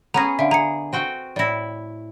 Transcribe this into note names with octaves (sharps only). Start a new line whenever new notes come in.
B3 C#4 G#4 A#5 A#6
D3 E5 F5
G#4 A#5 C#7
C4 F#4 G5
A2 E4 D5 A#6